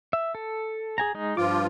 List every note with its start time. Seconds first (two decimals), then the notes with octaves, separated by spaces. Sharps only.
0.13 E5
0.35 A4
0.98 G#4 G#5 A#5
1.15 G#3 D#4
1.37 G2 F3 F4 D6